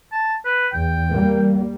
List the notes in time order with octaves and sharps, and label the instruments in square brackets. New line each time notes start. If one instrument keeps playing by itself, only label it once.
[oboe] A5
B4
[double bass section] E2 [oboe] G5
[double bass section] G3 A#3